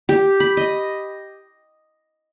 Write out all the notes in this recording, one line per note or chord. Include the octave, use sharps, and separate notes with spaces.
G4
B5
D#5